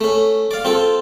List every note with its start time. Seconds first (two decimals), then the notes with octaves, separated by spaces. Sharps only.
0.01 A3 C#4
0.51 D5 F5
0.65 C4 F4 A4